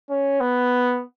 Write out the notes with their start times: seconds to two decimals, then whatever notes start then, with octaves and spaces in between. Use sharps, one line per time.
0.10 C#4
0.40 B3